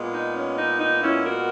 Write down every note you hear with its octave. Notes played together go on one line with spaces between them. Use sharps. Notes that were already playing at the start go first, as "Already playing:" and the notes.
Already playing: A#2 G#3 B3
D#4
C#4
D#4
D#4
C#4 E4
F#4 A#4